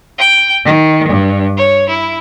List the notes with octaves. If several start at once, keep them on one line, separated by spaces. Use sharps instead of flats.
G5
D#3
G2
C#5
E4